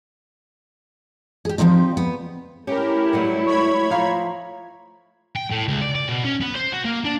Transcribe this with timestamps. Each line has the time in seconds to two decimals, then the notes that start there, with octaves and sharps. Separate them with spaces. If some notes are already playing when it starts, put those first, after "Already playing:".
1.45 G4 G#4
1.58 F3 G3 A3 C4 D#4
1.97 B3
2.67 A3 C#4 E4 G4 A#4
3.13 F#3 G3 B3
3.47 C#5 B5 C#6 G#6
3.91 F3 F5 A#5
5.36 G5
5.51 A2
5.68 C#2
5.81 D5
5.96 D5
6.09 B2
6.25 C#4
6.41 B3
6.56 C5
6.73 F#4
6.85 A#3
7.05 D4